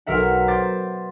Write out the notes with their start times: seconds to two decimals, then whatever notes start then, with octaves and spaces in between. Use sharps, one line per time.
0.06 B1 A#4 E5 F#5
0.48 C5 D6 A6